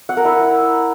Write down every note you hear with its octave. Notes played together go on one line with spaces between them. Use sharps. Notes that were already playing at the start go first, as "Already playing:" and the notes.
F#5
A#4
E4